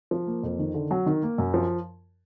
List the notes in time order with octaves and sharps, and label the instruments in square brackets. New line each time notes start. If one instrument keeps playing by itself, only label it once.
[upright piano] F3
A#3
F2
D#3
D3
F#3
D#3
A#3
F#2
F3